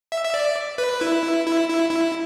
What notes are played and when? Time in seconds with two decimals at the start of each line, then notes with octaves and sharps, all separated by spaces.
0.12 E5
0.25 E5
0.34 D5
0.78 B4
1.01 E4
1.47 E4
1.69 E4
1.90 E4